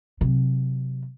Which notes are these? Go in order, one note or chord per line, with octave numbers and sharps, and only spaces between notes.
C3 F#3